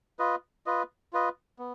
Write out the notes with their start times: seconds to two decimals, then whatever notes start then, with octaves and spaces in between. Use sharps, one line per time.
0.19 F4 B4 D#5
0.66 F4 B4 D#5
1.13 F4 B4 D#5
1.59 B3